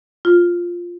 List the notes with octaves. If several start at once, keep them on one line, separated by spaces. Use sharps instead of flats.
F4